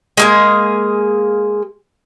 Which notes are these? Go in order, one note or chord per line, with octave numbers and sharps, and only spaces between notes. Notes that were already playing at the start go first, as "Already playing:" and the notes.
G#3 A#3 G#4